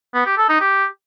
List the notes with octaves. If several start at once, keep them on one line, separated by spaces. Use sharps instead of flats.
B3
G4
A4
D#4
G4